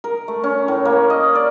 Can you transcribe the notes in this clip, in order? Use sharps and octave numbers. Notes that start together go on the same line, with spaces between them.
A#4
A3
C#4
A2
A#3
D#5
D5